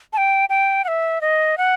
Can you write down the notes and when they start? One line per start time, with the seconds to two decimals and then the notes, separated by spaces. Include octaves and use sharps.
0.13 A5
0.17 G5
0.49 G5
0.84 F#5
0.88 E5
1.21 D#5
1.58 F#5